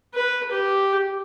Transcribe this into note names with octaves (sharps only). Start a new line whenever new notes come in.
B4
G4